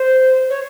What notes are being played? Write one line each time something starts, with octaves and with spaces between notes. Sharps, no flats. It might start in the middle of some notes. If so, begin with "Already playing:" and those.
Already playing: C5
C#5